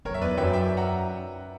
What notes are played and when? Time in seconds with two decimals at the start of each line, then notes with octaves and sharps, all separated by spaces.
0.05 F#2 A#4 C#5
0.14 E5
0.21 E2 B4 D5
0.37 F#2 E5 G5
0.53 E5 G5
0.77 F#5 A#5